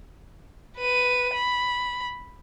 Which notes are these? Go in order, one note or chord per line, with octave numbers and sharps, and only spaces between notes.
B4 D#7
B5